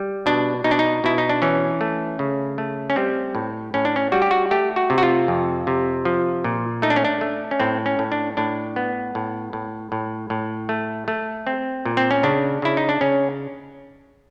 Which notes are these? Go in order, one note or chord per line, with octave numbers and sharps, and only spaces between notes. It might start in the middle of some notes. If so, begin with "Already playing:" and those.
Already playing: G3
B2 D4
B2 D#4
D4
D#4
B2 E4
D#4
D4
E3 C#4
A3
C#3
A3
C#4
G3 C4
A2
A2 C#4
D4
C#4
G3 F#4
G4
F#4
A3 G4
F#4
C3
F#4
F4
F2
C3
F3
A#2
A3 D#4
D4
C#4
D4
A3
C#4
A2 C4
C#4
A2
D4
A2 D4
B3
A2
A2
A2
A2
A3
A3
C4
A#2
C4
C#4
C#3 D4
C#3 E4
D#4
D4
C#3 C#4